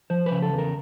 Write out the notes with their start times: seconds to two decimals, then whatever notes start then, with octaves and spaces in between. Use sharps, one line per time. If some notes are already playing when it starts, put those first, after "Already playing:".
0.10 F3 C5
0.26 B4
0.32 C#3
0.42 A4
0.53 E2
0.58 A#4